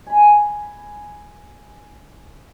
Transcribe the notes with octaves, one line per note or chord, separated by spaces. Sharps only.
G#5 B5